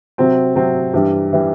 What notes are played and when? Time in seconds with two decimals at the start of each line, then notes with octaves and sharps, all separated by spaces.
0.18 C3 F#3 C4
0.55 C3 F#3 C4
0.93 G2 E3 G3
1.33 E3 G3